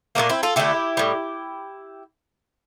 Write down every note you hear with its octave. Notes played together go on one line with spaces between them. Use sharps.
A#2 F3 A3 A#3 D4
C4 E4
F4 A4
D3 A3 E4 G4
A2 G3